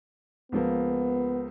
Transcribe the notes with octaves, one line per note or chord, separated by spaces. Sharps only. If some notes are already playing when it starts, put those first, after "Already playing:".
C#2 F3 A#3 B3